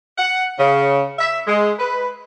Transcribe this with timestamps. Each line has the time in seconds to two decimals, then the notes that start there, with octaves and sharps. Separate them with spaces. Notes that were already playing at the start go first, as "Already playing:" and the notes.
0.18 F#5
0.59 C#3
1.19 E5
1.47 G#3
1.79 B4